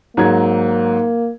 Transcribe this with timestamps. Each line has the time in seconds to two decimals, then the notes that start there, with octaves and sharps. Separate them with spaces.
0.17 G#2 F#3 A#3 G#6